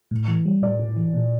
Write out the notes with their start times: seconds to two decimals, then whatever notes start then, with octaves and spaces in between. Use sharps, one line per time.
0.11 A2
0.28 E3
0.45 G3
0.62 A2 D5
0.79 A2
0.96 E3
1.14 A#2